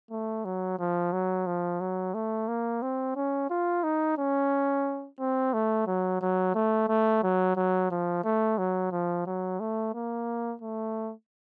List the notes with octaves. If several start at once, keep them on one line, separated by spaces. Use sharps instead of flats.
A3
F#3
F3
F#3
F3
F#3
A3
A#3
C4
C#4
F4
D#4
C#4
C4
A3
F#3
F#3
A3
A3
F#3
F#3
F3
A3
F#3
F3
F#3
A3
A#3
A3